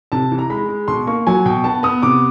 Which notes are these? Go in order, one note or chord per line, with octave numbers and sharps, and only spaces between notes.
C3 A5
E3
A#5
G#3 B5
G#3
B2 C6
A#3 C#6
F#3 G#5
B2 G5
B3 A5
B3 D#6
C3 D6